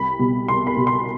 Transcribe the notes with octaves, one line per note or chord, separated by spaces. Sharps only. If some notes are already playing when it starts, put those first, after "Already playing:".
Already playing: C2 B5
B2 G3
C2 C6
B5
B2 G3
C6